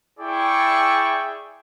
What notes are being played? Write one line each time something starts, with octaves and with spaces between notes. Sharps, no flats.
E4 G#4 D5 E5 G5 C#6